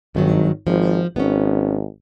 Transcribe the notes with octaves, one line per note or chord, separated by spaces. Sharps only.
G#1 G2 D#3 F#3
G#1 F3
G#1 B3 C#4